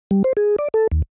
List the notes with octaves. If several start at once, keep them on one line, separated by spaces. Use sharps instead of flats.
G3
C5
G#4
D5
A4
D#2